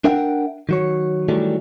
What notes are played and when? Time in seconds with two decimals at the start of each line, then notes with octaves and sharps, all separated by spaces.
0.04 D4 A#4 E5 F#5 G5
0.69 D#3 F#3 C#5
1.29 D#3 E3 F#3 G3 A3